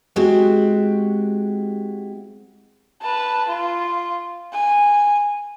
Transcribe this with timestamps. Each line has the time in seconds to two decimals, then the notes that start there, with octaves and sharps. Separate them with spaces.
0.16 G#3 C4 E4 F#4 G4
3.01 B4 A5
3.48 F4
4.52 G#5